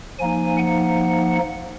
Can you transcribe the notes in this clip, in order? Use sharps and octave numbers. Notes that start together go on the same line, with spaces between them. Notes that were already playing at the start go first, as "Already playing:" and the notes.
F3 A#3 D#4 G#5
F#5